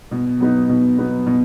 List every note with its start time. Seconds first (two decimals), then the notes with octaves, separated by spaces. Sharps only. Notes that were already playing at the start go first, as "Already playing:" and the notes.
0.11 B2
0.40 F#3 B3 D#4
0.69 B2
0.98 F#3 B3 D#4
1.26 B2